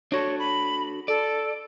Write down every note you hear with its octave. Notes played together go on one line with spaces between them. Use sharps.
D4 F#4 A4 C#5
B5
A4 D5